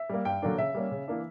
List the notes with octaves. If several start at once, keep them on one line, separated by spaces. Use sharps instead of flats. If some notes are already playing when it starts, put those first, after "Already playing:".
Already playing: E5
G3 A#3
G2 G5
D3 F#3 A#3 D4
C#3 E5
G3 A#3 C#4
C#3
E3 A#3 D4